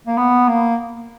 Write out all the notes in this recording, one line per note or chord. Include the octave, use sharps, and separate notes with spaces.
A#3
B3
A#3